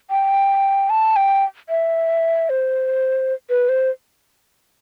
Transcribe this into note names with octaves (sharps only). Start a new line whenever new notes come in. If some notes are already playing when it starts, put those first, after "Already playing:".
G5
A5
G5
E5
C5
B4
C5